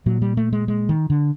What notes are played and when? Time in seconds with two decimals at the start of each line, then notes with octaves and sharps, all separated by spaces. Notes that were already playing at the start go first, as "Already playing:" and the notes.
0.06 A#2 F#3
0.22 G3
0.37 A3
0.53 G#3
0.68 G#3
0.89 D#3
1.10 D3